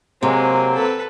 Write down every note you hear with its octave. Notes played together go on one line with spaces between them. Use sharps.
C3 F#3 G#3 A#3 C4
A4 B4